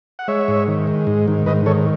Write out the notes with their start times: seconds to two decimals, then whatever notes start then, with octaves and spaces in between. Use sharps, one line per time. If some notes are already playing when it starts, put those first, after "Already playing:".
0.19 F#5
0.28 G#3 C#5 E5
0.48 G#2
0.68 D#3
0.87 G#3
1.07 G#2
1.28 D#3
1.46 G#2 B4 D#5
1.66 D#3 A4 C#5